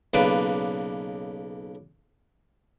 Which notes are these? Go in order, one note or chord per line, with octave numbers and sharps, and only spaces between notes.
B1 C#3 A#3 D4 B4 D6